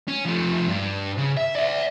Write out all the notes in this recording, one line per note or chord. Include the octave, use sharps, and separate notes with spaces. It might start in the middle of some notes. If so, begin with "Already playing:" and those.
C#4
F3 A3
G2
C#3
E5
D5 E5